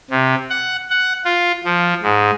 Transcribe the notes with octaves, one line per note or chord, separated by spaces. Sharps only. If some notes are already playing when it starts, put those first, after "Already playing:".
C3
F#5
F#5
F4
F3
G#2